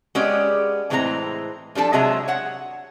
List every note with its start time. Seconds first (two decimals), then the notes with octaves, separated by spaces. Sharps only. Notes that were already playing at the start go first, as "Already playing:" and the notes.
0.15 G#3 B3 C#4 G4 G#4 D5
0.90 A2 E3 G#3 C4 F4 A#5
1.75 F3 G3 D4 A4
1.93 C3 F#3 G#3 G#4 E5 A#5
2.28 C#5 F#5